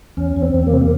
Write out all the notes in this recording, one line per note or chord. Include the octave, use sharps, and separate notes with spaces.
E2 C#4
E2
C4
E2
A#3
C3 C4
A#3